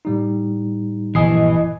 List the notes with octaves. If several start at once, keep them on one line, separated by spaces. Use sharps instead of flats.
A2 G3 D#4
A#1 G2 C#3 E3 D#5 G#5 D#6 C7